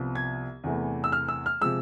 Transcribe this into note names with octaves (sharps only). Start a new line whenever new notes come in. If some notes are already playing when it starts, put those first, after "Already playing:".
Already playing: C2 C3 F3 B3
G#6
E2 C3 E3 A3
E6
F6
E6
F6
C3 F3 G#3 E6